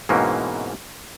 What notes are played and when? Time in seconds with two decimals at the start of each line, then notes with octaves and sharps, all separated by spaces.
0.09 G#2 B2 E3 A#3 C4 C#4